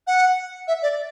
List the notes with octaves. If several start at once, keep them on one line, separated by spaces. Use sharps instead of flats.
F#5
E5
D5